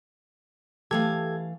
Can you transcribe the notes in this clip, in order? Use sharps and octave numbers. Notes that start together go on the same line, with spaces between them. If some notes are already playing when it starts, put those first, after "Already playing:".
E3 A3 G4 A4 F5 G#6